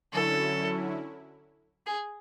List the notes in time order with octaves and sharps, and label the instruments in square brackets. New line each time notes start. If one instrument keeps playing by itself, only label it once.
[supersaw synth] D3 F#3 C#4 E4 [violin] A4
[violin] G#4